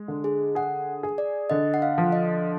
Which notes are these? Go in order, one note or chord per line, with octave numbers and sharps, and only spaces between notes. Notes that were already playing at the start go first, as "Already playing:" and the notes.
Already playing: G#3
D3
G#4
G#4 F#5
G#4
D5
D3 D#5
F#5
F5
F3
D#5